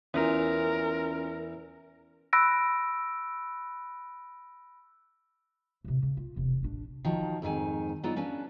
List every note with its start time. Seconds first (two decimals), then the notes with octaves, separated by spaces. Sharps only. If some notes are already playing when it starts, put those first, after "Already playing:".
0.14 E2 C#4 F4 A#4 A#5
2.33 B5 E6 F#6 A#6 D7
5.84 A2 C3
6.03 C#3
6.17 F4
6.36 E1 C3
6.63 A1 D4
7.05 D#3 F3 F#3
7.42 F2 G#2 D#3 G#5
8.03 F#3 B3 D4 D#4 F4
8.16 A#3 C#4 D4 B4